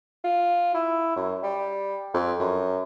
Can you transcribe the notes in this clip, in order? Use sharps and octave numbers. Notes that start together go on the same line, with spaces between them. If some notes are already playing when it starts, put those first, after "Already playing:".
F4
E4
F#2
G3
F2
F#2